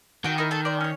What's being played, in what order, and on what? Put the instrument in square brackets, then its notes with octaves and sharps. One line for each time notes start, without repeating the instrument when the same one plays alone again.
[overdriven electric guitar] D#3 [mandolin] F#4 G5
[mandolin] D#4 E4 A#4
A4 A5
C5 D5
C#4 C#5